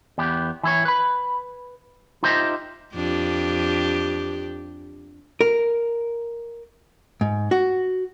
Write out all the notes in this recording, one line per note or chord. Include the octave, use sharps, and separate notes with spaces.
E2 B3 G4
E3 E4 C#5
B4 B5
D#4 F4 G4 C5 D#5 E5
F2 D4 G4
A#4
G#2
F#4